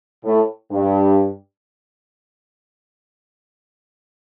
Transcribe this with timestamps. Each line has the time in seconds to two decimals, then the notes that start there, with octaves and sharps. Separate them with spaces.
0.24 A2
0.71 G2